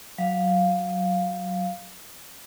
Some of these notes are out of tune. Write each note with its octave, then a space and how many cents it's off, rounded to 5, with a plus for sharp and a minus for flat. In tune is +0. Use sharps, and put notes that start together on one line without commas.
F#3 +0 F5 +0